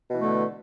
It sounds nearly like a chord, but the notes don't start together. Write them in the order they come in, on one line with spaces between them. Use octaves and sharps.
B2 E3 A3 D3